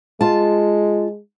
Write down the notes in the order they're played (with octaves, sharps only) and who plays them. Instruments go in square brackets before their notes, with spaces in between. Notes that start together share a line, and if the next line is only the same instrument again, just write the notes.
[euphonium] G#3 [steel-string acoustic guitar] F4 A5